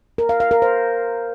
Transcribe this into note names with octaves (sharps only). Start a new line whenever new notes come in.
A#4
F5
F5
A#4
C5